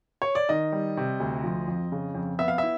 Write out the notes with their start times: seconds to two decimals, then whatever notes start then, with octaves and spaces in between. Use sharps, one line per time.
0.22 C#5
0.35 D5
0.49 D#3 D#5
0.72 G3
0.97 C3
1.20 D2
1.43 F3
1.68 F2
1.92 C#3
2.15 F2
2.39 B3 E5
2.48 F5
2.58 E4 E5